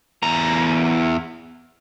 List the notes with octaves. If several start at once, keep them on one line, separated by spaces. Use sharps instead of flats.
E2 A#5